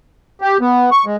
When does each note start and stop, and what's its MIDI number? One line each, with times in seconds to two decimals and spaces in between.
0.41 0.57 67
0.61 0.90 59
0.91 1.05 85
1.06 1.16 56